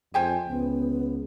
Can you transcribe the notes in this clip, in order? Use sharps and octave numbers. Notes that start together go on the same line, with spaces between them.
F2 C5 G5 G#5
C#2 B3